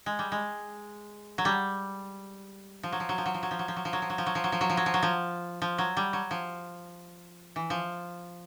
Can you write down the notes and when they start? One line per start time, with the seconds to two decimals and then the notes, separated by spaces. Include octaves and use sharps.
0.06 G#3
0.19 G3
0.32 G#3
1.38 F#3
1.45 G3
2.83 F3
2.92 F#3
3.00 F3
3.09 F#3
3.18 F3
3.26 F#3
3.34 F3
3.43 F#3
3.51 F3
3.59 F#3
3.68 F3
3.76 F#3
3.85 F3
3.93 F#3
4.02 F3
4.10 F#3
4.18 F3
4.26 F#3
4.35 F3
4.44 F#3
4.52 F3
4.61 F#3
4.70 F3
4.77 F#3
4.86 F3
4.94 F#3
5.03 F3
5.62 F3
5.78 F#3
5.97 G3
6.13 F#3
6.31 F3
7.56 E3
7.70 F3